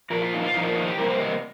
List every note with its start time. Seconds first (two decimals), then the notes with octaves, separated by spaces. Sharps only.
0.10 A#2 F3 A#3 A#4
0.22 F4
0.33 D#4
0.43 F4
0.54 A#2 F3 A#3 D#4
0.66 F4
0.75 D#4
0.87 G4
0.97 C3 G3 A#3 A#4
1.09 C5
1.20 D#5